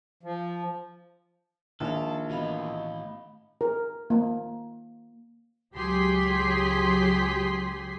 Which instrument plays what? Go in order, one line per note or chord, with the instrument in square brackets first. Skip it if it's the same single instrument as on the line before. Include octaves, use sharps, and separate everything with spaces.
[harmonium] F3
[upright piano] A#1 [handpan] D#3 G#3 D#4 [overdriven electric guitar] A4 [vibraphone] F5 A5
[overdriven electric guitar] A2 E3 [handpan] B3 F#4 [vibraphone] D#5 F5 B5
[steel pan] A#4
A#3
[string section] C#2 F#3 G4 G#4 C6 B6